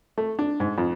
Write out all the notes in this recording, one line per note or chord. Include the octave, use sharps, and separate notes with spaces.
A3
D4
G#2
F2